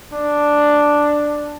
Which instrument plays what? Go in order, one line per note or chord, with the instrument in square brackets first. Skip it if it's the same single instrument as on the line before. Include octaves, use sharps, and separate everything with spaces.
[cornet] D4